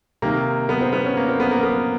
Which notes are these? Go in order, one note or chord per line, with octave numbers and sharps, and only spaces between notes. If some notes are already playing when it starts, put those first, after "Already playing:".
C3 D#3 A#3
B3
C4
B3
C#4
A#3
C4
B3
A#3
B3